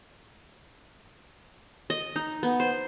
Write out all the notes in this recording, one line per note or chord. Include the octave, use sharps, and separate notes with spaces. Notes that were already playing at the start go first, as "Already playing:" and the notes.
D#5
D#4
B3
C5